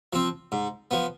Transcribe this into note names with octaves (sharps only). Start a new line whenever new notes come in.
F3 C4
G#2
F3 B3